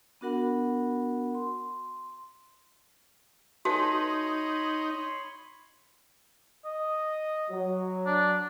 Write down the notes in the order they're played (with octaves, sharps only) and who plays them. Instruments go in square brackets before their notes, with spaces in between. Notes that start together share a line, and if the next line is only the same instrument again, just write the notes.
[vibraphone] B3 D4 F#4 A#4 F#5 B5
C6
[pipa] A3 C#4 B4 [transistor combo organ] D#4 [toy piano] F#4 [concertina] C#5 B5 C6
[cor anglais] D#5
[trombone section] F#3
[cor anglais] D4